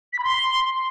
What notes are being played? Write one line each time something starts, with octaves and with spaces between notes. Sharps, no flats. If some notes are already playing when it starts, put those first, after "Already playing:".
B6
B5
C6